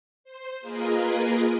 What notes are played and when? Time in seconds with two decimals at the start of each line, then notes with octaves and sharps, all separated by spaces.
0.24 C5
0.61 A#3 F4 G#4 A#4 B4 D#5